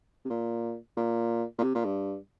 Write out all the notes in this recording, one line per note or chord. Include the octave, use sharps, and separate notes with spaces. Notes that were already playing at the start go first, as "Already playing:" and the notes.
C3
A#2
A#2
A#2
C3
A#2
G2